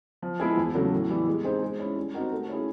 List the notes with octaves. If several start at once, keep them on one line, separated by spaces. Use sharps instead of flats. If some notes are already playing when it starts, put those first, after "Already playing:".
F3
G#3 B3 E4 G#4
E2
C#3 F#3 A3
A2
E3 G3 B3
G#3
C4 D#4 G#4 C5
G#3
C#4 E4
G3
C4 D#4 F#4 A#4
A3
C#4 E4 G#4